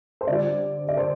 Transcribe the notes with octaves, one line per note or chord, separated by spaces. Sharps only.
C5
D3 G3 D5
D5
D3 C5